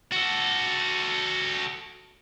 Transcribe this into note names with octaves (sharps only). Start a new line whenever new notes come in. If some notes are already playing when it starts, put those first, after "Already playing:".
F#4 A4